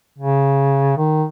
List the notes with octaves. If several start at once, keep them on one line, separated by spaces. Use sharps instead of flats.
C#3
D#3